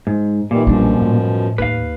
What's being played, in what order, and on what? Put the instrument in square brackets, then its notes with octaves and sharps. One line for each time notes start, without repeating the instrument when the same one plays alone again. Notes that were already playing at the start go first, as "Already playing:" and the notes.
[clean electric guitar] G#2
[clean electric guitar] A#2 [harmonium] D#3 E3 G3
[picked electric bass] B1 D4 [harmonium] F#2 B2 F3 [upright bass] G3
[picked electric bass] A2
[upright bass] D#2 [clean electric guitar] B4 F5